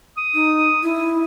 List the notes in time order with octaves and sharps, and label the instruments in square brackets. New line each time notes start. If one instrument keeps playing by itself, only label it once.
[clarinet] D#6
[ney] D#4
E4